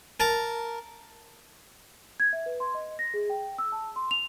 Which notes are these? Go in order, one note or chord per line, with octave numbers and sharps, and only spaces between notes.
A#4 A5
G#6
E5
B4
C6
D#5
A#6
G#4
G5
E6
A5
C6
F7